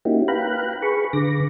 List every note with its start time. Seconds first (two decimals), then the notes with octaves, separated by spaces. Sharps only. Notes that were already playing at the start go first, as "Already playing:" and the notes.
0.05 A#3 C#4 D#4 E4 F#4 G4
0.28 B4 F5 G5 A#5 B5 F#6
0.82 G#4 B4 B5 C#6
1.13 D3 D6 A#6